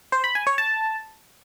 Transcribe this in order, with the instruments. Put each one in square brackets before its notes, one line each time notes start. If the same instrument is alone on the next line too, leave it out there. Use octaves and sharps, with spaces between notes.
[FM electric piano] C5
B5
G#5
C#5
A5